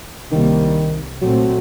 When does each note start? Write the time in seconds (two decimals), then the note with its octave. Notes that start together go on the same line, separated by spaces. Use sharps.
0.31 C2 C3 D#3 G3 A#3
1.21 A#2 F#3 A3 C4